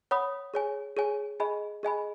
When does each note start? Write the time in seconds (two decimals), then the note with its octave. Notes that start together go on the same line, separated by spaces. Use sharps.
0.11 C#5 F#5 B5 D#6
0.54 G#4 C#5 G#5
0.97 G#4 C#5 G#5
1.40 G#4 D#5 G#5 B5
1.83 G#4 D#5 G#5 B5